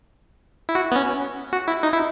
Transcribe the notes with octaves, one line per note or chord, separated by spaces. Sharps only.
E4
F#4
B3
C#4
F#4
E4
D#4
E4